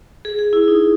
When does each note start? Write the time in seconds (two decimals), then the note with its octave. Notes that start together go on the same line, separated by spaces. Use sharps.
0.25 G#4
0.39 G#4
0.53 E4
0.68 D#4